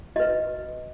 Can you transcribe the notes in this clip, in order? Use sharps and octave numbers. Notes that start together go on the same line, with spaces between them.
F#4 B4 D#5